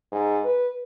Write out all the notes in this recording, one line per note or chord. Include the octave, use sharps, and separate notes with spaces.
G#2
B4